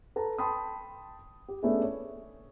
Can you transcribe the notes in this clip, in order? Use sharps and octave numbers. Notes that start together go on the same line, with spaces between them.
A4 B4 A5 A#5
G5 A5 B5 C6 D#6
G4
A3 B3 C#4 D4 E4 G#4
C#5